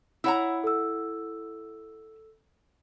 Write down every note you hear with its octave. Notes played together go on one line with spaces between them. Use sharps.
E4 C#5 F#5 A#5 B5 E6
A4 E6